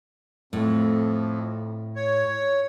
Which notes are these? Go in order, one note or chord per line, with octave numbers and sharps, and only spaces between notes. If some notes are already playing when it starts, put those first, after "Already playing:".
F2 A2
C#5